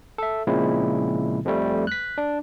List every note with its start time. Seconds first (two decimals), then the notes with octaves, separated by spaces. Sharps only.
0.18 A4 E5
0.47 A#2 C#3 F3 G#3 C4 E4
1.45 F2 F3 G3 A3
1.87 F#6 B6
2.18 D4